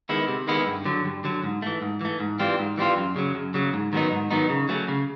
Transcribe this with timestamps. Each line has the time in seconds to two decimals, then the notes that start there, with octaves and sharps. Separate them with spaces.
0.09 D#3 G#3 B3 E4
0.28 C3
0.47 D#3 G#3 B3 E4
0.67 G2
0.85 D3 F#3
1.05 G2
1.24 D3 F#3
1.44 G#2
1.62 E3 A3
1.82 G#2
2.01 E3 A3
2.20 G#2
2.39 E3 G3 C4 F4
2.59 G#2
2.78 E3 G3 C4 F4
2.97 F#2
3.16 C#3 F#3
3.35 F#2
3.54 C#3 F#3
3.73 G#2
3.93 D#3 F#3 B3 D#4
4.12 G#2
4.30 D#3 F#3 B3 D#4
4.50 C#3
4.69 F#3 A3 C#4
4.88 C#3